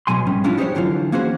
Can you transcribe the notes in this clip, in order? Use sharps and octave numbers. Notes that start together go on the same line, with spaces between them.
B1 B2 F#3 G#5 C6
G#2 G3 C#4
F3 C#4 D4 E4 F4
D#4 G4 G#4 A#4 C5 C#5
D3 E3 F#3 F4
A#3 C#4 F#4 G#4 C5